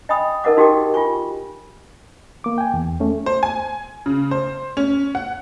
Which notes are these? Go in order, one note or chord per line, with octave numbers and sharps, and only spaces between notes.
D#5 G5 G#5 B5 D#6
D#4 A4 A#4 D#5 F#5 D6
D#4 F#4 G4 A#4 G5 D6
F4 G4 G#5 C#6
A#3 D6
G5 G#5
E2
A3 C#4
C5
G#5
C#3
C5
C#4
F#5